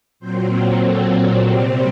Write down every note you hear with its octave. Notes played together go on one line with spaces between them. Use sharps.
A#2 F#3 C4 C5
A#4
A#2 F#3 C4 A4
C3 G3 C4 G4